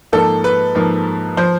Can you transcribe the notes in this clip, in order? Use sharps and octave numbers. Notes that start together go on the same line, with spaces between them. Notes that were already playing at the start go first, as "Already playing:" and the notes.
G#2 F3 A#3 A4
B4
G#2 F3 A#3
F3 C5